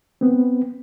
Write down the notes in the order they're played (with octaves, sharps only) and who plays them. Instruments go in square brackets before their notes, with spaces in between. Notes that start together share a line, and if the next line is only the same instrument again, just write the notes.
[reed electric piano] B3 C4